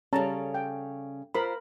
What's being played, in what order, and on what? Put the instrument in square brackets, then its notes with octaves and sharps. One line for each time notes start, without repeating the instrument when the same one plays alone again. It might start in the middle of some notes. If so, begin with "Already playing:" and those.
[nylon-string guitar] C#3 G3 A4 [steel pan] C#4 A5 A#5
[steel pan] G5
[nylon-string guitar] F4 C5 [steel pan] A#4 B5